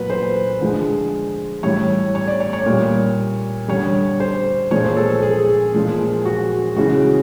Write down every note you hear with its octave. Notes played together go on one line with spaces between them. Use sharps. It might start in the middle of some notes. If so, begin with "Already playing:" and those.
Already playing: A#2 F#3 B4
C5
D3 F3 G#3
A2 E3 G3 C#5
C#5
D5
C#5
C#5
A#2 G3
D3 G3 C#5
C5
A#2 F3 G#3 C#5
C5
A4
A4
G#4
A#2 F3 G#3
F#4
C#3 E3 G#3 F#4